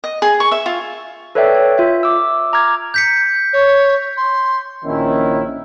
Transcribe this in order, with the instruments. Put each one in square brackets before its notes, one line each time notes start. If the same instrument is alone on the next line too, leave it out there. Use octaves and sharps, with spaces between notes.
[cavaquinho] D#5
G#4
C#6
E5
F4
[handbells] A4 B4 C#5 D5 E5 G5
C#5
F4 E5
D6 E6
A#5 D6 F6 G#6
[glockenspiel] G6 B6 C#7
[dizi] C#5
C6
[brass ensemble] A#1 D#3 C#4 E4